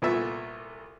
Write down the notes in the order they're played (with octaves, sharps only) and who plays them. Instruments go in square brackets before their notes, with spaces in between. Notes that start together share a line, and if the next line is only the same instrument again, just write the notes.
[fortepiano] C2 A#2 A3 B3 E5